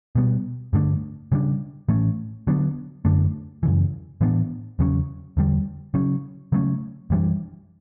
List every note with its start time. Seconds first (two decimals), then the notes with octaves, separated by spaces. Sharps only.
0.15 B2 G3 B3
0.73 G2 D3 A3 D4
1.32 C#3 G3 D4
1.89 A2 E3 A3 C#4
2.47 D3 F#3 B3 D4
3.05 F#2 D3 A3 D4
3.63 F#2 C#3 E3
4.21 A2 E3 B3 D4
4.79 E2 C#3 F#3 C#4
5.37 E2 D3 G3
5.94 C#3 F#3 C#4
6.52 C#3 F#3 A3 C#4
7.10 F#2 E3 G3 D4